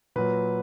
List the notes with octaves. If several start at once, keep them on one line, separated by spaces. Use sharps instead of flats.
A#2 F#3 B4